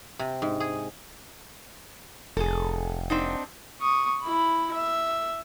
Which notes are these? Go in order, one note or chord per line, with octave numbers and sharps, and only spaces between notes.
C3
G#2
G#4
F1 G#4 A4
C4 D4 D#4
C#6 D#6
E4 B5
E5